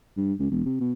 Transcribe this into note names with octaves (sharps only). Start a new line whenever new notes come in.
G2
C#2
E1
C3
B2